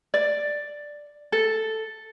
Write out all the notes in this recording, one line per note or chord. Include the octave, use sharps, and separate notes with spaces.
D5
A4